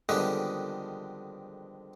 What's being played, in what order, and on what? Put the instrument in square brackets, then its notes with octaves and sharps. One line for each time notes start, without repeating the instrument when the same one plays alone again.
[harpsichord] F2 D3 D#3 G3 G#3 B3